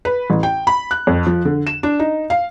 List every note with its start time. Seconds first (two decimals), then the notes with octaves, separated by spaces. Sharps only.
0.05 B4
0.30 A1
0.43 G5
0.67 B5
0.91 F#6
1.07 F2
1.27 F3
1.45 D3
1.67 E7
1.83 D4
1.99 D#4
2.30 F5